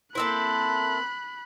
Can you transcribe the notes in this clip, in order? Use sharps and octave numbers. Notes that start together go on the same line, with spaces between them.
A#3 C4 E4 A4 C5 B5 F#6